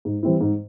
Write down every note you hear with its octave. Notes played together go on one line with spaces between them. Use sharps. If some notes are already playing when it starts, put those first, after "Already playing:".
G#2
E3 G3 C4 E4
G#2